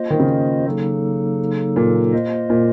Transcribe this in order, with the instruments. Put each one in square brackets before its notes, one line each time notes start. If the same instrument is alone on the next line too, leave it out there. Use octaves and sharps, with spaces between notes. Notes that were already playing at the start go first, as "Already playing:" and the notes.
Already playing: [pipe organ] A#3 F4 C5 D#5
[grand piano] D#3
C#3
[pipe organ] C#3 F#3 A#3 D#4 A4
[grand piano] A#2
[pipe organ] A#3 F4 C5 D#5
[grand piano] A#2